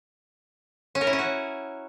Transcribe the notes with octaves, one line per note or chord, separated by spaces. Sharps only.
C#4
A#4
E4
C#4
F#4